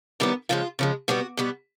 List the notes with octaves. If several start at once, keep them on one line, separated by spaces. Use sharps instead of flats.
F#2 D#3 G3 B3 E4
C#3 F3 G#3 F4
C#3 F3 G#3
B2 G3 B3 F#4
B2 G3 B3